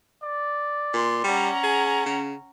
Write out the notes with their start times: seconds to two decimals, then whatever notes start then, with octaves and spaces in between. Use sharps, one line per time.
0.23 D5
0.93 A#2 C6
1.24 G3 C#4 F#5 A#5
1.63 G#4
2.06 C#3